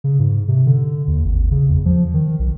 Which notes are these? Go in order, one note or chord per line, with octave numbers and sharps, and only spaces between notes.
C#3
G#2
C3
D3
D#2
G#1
C#3
E2
F3
D#3
B1